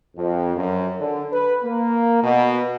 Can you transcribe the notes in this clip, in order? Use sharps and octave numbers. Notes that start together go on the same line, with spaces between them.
F2
F#2
D3
B4
A#3
B2